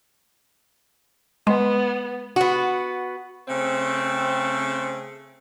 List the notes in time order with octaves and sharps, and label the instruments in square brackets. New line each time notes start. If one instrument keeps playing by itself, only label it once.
[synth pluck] G#3 [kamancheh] B3
[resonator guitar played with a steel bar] B3 F#4
[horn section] C#3 A3 C4